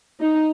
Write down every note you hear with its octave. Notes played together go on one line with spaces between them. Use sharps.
D#4